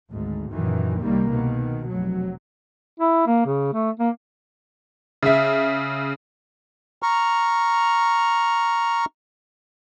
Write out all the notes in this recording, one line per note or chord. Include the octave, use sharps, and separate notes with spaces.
G#1 D2 G#2
F#2 A#2 D#3 E3
C2 D#3 G3 A#3
B2 D#3
F1 F#3
E4
A#3
C#3
A3
A#3
C#3 E5
A#5 C#6 F6